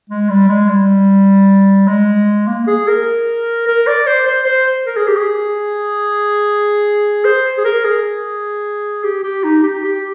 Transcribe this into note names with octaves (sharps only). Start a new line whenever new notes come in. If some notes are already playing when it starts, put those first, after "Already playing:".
G#3
G3
G#3
G3
G#3
A#3
G#4
A#4
A#4
D5
C5
C5
C5
A#4
G#4
G4
G#4
C5
G#4
A#4
G#4
G4
G4
D#4
G4
G4